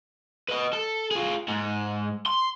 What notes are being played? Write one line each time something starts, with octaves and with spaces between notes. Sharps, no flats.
B4 D#5
A4
F4 G#4
G#2
C6